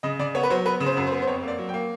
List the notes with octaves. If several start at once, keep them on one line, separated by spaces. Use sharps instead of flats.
C#3 D#5
C#3 D5
B3 C#5
B4
F#3 C5
B3 B4
C#3
C5
F#2
C5
B3
C5
F2 C#5
A#3 D5
F#3
G5
A#3